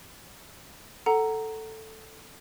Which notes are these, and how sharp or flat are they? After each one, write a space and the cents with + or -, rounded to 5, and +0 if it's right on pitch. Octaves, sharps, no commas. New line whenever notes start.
A4 +0 F#5 +15 A#5 +0